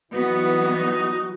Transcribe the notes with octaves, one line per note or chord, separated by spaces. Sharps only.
E3 F#3 G3 B3 D#4 F#4